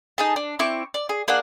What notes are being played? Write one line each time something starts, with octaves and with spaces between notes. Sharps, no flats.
D#4 G#4 A5
D4
C4 E4 C#6 D6
D5
G#4
A#3 D4 G#4 F#5